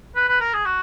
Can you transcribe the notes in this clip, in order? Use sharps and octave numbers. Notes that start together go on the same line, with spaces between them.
B4
B4
A#4
G#4
F#4